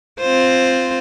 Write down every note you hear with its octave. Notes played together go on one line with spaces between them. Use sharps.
C4 F4 C5